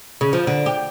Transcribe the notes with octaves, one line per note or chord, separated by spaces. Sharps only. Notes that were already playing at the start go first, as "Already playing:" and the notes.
C#3
F3
D3
G4